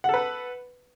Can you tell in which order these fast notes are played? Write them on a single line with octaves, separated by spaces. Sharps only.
F#5 A4 B4